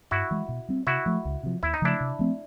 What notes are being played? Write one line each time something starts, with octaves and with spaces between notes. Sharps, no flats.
G2 E4 F#4
E3 G#3
B2
G3 C4
C3 E4 F#4
F3 A3
C#2
C3 F3
D#2 E4
D#4
C#3 F3 A3 D4 E4
C3
F3 A3 C4